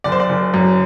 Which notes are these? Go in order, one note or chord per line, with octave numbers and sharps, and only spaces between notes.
F#1 D5
C5
D5
F#1
F#2